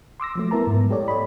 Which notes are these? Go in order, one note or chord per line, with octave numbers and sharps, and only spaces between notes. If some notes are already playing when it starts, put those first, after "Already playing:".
C6 D6 E6 A#6
F3 F#3 A3
B3 E4 A#4 A5 A#5
G#2
G4 A4 C#5 D5
C#5 D#5 B5